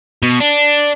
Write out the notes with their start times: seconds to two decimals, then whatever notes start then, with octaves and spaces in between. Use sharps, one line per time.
0.22 B2
0.40 D4